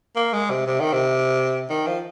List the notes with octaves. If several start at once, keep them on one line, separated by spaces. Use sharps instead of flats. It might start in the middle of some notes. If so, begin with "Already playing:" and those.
A#3
G#3
C3
C3
D#3
C3
D#3
F3